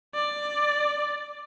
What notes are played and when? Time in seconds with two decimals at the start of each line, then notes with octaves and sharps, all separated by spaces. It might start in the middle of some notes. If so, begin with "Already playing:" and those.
0.15 D5